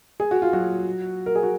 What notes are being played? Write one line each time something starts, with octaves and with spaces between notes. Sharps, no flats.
G#4
F#4
F4
F#3 F#4
A#4
G#4
F#4